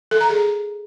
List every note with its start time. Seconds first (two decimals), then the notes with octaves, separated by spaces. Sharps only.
0.11 A4
0.21 A#5
0.30 G#4